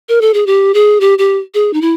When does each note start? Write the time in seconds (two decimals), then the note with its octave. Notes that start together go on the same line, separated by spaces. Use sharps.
0.09 A#4
0.21 A4
0.34 G#4
0.47 G4
0.74 G#4
1.01 G4
1.18 G4
1.54 G#4
1.73 D#4
1.81 E4